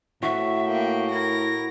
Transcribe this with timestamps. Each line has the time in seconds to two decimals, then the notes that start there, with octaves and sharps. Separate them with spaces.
0.23 A2 F#4 E5
0.66 A#3 G5
1.12 E4 A#4 A#6